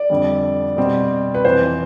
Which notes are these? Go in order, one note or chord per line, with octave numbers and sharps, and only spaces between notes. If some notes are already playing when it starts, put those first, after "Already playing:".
Already playing: D5
F2 D3 G3
B2 G3 C4
B4
F2 C3 E3 C5